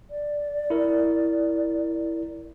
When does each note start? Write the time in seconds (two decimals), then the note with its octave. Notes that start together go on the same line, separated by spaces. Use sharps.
0.10 D5
0.70 E4 A#4